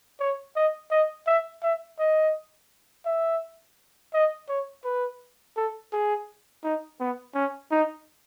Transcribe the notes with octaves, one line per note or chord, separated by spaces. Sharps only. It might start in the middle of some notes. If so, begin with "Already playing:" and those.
C#5
D#5
D#5
E5
E5
D#5
E5
D#5
C#5
B4
A4
G#4
D#4
B3
C#4
D#4